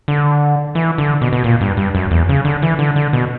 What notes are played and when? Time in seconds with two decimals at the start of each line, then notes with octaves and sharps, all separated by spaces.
0.08 D3
0.75 E3
0.98 D3
1.21 B2
1.33 B2
1.44 A#2
1.61 G2
1.77 G2
1.95 F#2
2.11 E2
2.29 C#3
2.45 D3
2.62 E3
2.79 D3
2.96 D3
3.13 B2